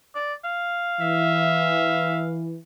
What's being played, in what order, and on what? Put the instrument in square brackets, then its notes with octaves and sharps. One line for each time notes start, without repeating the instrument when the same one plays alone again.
[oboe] D5
F5
[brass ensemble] E3 [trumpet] E5